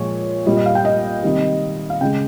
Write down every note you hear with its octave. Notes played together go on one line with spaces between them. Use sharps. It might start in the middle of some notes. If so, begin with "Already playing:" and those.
Already playing: A#2 F3 G#3 C#5
A#2 G3 D#5
D#5
F5
G5
D#5
C3 D#3 G3
F5
C#3 G#3 G5